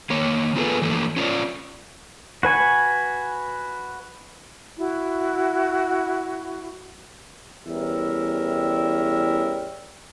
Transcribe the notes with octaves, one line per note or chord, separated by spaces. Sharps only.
D#3 A#3 C#5
B3 F4 G#4 A4 B4
E3 F3 A3 A#3
C#4 F4 B4 C#5 D5
F#4 B4 G#5 C#6
E4 F#4
E2 E3 G3 C#4 A#4 E5